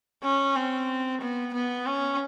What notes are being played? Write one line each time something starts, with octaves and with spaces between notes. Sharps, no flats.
C#4
C4
B3
B3
C#4